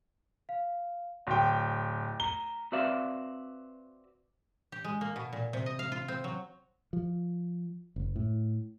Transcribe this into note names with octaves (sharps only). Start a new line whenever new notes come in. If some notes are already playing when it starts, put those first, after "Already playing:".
F5
D1 G5 C6
A#5 G7
C4 F#4 B4 D5 E5 F5
G4
G#3
A#3
B2
A#2
C3
D#5
F5
F4
C4
F#3
F3
F#1
A2